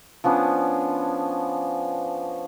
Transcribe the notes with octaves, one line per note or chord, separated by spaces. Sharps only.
F3 B3 C#4 D4